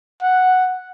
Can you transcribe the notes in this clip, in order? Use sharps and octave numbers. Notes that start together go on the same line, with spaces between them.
F#5